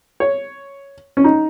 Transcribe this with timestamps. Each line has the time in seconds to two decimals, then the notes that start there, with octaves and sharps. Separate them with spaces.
0.20 C#5
1.17 C#4
1.24 D#4